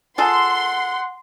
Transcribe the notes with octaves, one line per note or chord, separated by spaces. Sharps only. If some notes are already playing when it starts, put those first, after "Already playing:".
F4 G#4 A4 F#5 C6